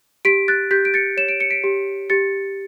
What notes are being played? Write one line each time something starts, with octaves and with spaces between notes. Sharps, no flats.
G4 B6 D7
F#6 A6
G4 G6 B6
D7
A6 C#7
C#5 E7
D7
C#7
B6 D7
G4
G4 A6 C#7